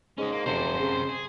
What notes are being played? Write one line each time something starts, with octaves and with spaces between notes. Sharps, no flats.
G#2 C#4 D#5
A#3
F1 F#2 C3 C5
C#3
G#4